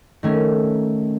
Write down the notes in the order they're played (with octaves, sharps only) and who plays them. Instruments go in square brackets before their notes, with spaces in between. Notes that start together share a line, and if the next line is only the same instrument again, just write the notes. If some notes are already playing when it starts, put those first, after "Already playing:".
[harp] D#3 A3 C#4